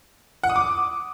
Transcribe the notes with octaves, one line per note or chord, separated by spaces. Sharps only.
F#5
D#6
D6